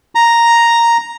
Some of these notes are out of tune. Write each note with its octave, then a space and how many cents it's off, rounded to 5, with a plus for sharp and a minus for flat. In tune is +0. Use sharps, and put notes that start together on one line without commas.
A#5 +0